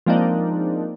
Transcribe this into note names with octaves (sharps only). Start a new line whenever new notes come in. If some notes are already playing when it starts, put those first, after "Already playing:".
F3 G#3 A#3 C4 D4 D#4